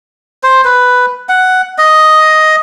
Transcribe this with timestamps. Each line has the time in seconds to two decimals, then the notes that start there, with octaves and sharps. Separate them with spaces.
0.43 C5
0.65 B4
1.29 F#5
1.78 D#5